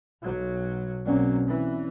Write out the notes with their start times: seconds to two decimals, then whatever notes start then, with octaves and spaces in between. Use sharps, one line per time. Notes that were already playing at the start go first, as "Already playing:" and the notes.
0.22 B1 F#3
1.07 B1 F#3 A#3 C4 C#4 D5
1.47 E3